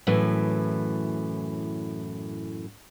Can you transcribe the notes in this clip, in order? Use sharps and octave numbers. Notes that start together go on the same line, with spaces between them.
F#2 A2 E3